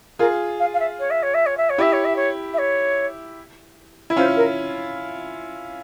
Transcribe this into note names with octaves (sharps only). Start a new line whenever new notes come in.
F4 G#4 A#4
F5
F5
E5
C#5
E5
C#5
E5
C#5
E5
C#5
E4 G4 E5
C#5
E5
C#5
E5
C#5
E4
C#4 F4 C5
A#4